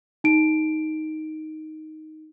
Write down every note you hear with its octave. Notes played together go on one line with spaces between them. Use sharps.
D#4 D7